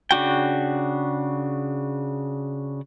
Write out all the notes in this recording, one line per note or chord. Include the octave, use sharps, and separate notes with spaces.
C#3 D4 F#4 G5